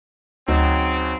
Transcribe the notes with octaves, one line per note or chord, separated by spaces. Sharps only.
D2 C#3 F#3 C4 D#4 F#4